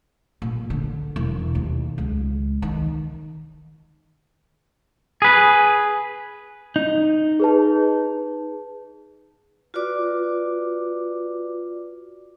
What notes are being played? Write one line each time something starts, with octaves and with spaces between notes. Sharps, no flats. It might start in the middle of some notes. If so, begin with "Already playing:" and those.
A#2
D3
E1
D#2
C#2
D#3
G#4 B4
D#4
G#4 B4 A5
F4 F#4 B4 D5 D6